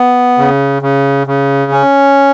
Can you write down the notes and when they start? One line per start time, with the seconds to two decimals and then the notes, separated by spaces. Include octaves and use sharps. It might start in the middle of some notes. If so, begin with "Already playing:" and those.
Already playing: B3
0.38 C#3
0.82 C#3
1.27 C#3
1.71 C#4